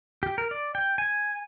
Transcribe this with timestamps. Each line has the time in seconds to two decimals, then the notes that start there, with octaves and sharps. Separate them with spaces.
0.23 G4
0.38 A#4
0.51 D5
0.75 G5
0.98 G#5